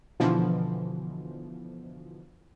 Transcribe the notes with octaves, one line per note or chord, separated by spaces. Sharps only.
B2 D3 E3 F3